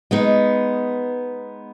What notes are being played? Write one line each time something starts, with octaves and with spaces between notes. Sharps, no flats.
G#3 B3 D#4